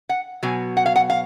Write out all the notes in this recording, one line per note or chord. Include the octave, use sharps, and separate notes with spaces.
F#5
B2 F#3 G#5
F#5
F5
F#5
F5